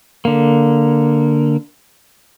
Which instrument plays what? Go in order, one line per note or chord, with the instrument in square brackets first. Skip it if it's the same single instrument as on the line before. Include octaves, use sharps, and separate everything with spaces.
[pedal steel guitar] D3 A#3